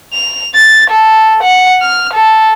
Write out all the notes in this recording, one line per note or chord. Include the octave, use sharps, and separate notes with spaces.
F7
A6
A4
F#5
F6
A4